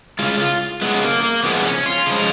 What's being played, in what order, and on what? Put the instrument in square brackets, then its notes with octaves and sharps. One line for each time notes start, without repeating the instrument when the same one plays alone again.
[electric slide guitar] C#3 G#3 F4
F4
C#3 G#3 B3
A#3
A#3
C#3 F3 G#3 B3
C#4
F4
C#3 F3 G#3